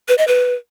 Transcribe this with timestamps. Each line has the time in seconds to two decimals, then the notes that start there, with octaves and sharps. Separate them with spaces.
0.08 B4
0.18 D#5
0.28 B4